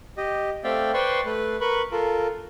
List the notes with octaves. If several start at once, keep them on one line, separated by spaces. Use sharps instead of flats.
G4 D#5
A3 C4 D5 E5 F5 G5
B4 C5 D5 G5 C6 C#6
A3 B4
A#4 B4 B5 C#6
F4 A4 A#4